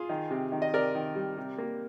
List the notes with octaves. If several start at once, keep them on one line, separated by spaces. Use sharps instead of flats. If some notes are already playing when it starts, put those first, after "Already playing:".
Already playing: F4 G#4
D#3
C3
D#3
D#5
C3 A#4 D5
D#3
G3
C3
A#3